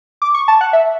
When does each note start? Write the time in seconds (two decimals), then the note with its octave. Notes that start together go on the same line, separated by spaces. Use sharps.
0.22 D6
0.34 C#6
0.48 A5
0.61 F#5
0.73 E5